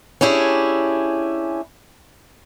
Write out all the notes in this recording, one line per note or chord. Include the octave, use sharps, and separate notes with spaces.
C#4 D4 E4 G4 G#4